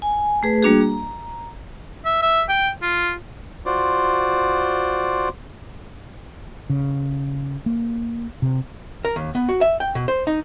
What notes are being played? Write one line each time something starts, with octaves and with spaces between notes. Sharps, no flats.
G#5
A3 G#4 B4
G3 A#3 D4 F#4 G#4
A#5
E5
E5
G5
F4
F4 F#4 C5 D5
C#3
A#3
C3
A#4
D#2
B3
F#4
E5
G5
B2
C5
D#4